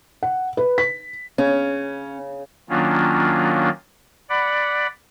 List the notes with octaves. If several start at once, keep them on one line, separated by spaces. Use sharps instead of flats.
F#5
B4
B6
C#3 C#4
D#3 F#3 A#3 C#4 D4 F4
D5 F#5 B5